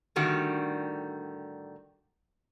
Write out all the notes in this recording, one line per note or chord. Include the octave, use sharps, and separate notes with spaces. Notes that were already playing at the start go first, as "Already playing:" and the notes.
A2 D3 D#3 G3 F#4